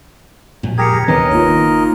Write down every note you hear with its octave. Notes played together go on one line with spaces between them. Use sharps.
F2 A#2
G4 G#4 A#4 G#6 A#6 C#7
D#2
D#3 B3 D4 A#4 B4 C#5 D#5
F#1 A#3 D#4 F4